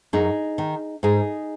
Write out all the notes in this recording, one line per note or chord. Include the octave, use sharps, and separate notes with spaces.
F#2 D#4 G#4
D#3
G#2 D#4 G#4